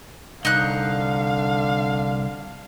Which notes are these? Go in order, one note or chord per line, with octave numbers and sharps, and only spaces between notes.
C2 D3 D#4 F5 F#6